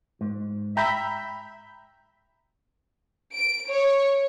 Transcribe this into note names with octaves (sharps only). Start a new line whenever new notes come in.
G#2
E5 G5 A#5 B5 G6
D7
C#5